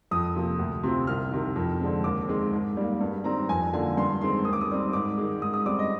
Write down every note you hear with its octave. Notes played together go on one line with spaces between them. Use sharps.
F2 D#6
C3 F3 A#3
D2
C3 F3 C4
C2 F6
C3 D#3
F2
D3 G#3 C4
D#2 D6
D#3 G#3 C4
G#2
G3 A#3
G2
D#3 G3 C4 A#5
F2 G#5
D3 F3 A#3 G#5
G2 C6
D#3 G#3 C4 C6
D#2 D#6
D6
D#6
D#3 G3 C4
G#2 D6
D#3 G#3
G#2 D#6
D#6
G3 C4 D6
D#5